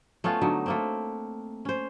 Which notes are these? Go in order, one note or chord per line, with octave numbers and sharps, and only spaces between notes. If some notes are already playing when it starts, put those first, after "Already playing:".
A3 B3 C#4 F4
D3 F#3 D#4
A3 A#3 C4
C#4 C5